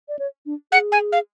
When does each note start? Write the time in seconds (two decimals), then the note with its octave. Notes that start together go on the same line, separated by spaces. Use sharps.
0.09 D5
0.19 C#5
0.46 D4
0.72 G#4 F#5
0.92 G#5
1.12 F5